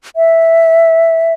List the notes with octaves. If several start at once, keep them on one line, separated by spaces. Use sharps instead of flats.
E5